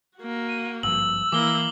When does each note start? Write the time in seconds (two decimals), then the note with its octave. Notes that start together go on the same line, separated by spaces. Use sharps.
0.18 A#3 F#4
0.49 D#7
0.83 G#1 G2 F3 E6 F#7
1.32 E3 A#3 E4 D6 G7